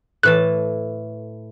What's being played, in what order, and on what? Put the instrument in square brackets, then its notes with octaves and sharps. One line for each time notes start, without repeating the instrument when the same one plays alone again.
[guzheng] A2 E3 A5 [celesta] A4 B4 [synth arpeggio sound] F#6